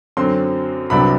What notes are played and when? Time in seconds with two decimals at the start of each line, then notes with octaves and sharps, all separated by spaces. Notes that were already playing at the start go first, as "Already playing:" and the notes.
0.17 F#2 D3 F#3 C4 C6
0.90 C2 C3 F#3 B3 D4 B5